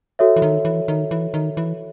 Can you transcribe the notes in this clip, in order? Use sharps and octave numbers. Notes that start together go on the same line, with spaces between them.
F#4 A4 C#5 E5
E3
D#3
E3
D#3
E3
D#3
E3